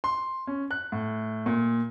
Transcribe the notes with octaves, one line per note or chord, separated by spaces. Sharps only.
C6
C#4
F#6
A2
A#2